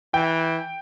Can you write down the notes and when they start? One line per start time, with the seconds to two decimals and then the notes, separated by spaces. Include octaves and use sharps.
0.14 E3 G5